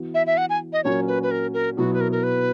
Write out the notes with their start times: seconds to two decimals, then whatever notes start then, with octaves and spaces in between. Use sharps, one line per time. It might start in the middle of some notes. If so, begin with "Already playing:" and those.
Already playing: E3 B3 F#4
0.14 E5
0.27 E5
0.37 F#5
0.50 G#5
0.73 D#5
0.84 A#2 F#3 C#4 F#4 A#4 C#5
1.08 B4
1.23 B4
1.31 A#4
1.54 A#4
1.77 B2 F#3 B3 E4 F#4
1.94 B4
2.01 A#4
2.12 A#4
2.23 B4